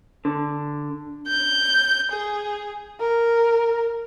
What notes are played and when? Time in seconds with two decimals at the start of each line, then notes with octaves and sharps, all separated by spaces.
0.25 D3
1.28 G6
2.12 G#4
3.00 A#4